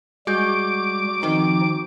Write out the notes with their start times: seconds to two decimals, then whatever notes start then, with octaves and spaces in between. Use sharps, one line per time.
0.27 G3 G#3 F#4 D6 G6
1.23 D#3 F3 C4 D#4